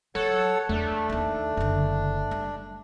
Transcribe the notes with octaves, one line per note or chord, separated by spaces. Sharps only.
F#3 A4 C#5 F#5
E2 A3 D4
D#2 A#3
F#1 D3
G3